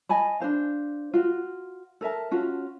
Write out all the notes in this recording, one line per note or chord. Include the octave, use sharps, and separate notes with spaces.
D#5 G#5 A5 B5
D4 D#4 C5 F5
F4 F#4
A4 A#4 E5 A5
C#4 F4 F#4